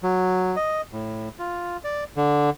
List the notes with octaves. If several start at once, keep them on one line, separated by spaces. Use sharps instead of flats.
F#3
D#5
A2
F4
D5
D3